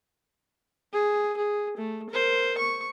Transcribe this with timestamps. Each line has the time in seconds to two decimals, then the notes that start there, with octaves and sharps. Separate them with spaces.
0.93 G#4
1.37 G#4
1.77 A3
2.10 A#4 C5
2.58 C#6